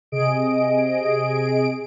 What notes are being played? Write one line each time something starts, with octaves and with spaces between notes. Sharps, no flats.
C3 G#4 D#5 D7